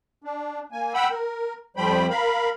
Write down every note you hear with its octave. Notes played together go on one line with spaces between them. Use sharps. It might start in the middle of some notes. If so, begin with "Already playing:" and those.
D4
A#3 G#5
F#5 G5 B5 E6
A#4
F2 F3 G3 C5 G5 B5
A#4 F5 B5